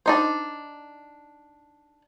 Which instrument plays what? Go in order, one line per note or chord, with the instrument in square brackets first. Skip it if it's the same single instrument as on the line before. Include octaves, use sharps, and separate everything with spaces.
[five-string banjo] D4 D#4 C5